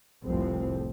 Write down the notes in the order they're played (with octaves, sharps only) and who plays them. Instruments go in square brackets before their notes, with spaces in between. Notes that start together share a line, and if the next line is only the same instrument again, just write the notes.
[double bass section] F1 C2 A2 F3 C4